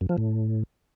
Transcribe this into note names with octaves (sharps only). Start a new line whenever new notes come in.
F#2
F3
A2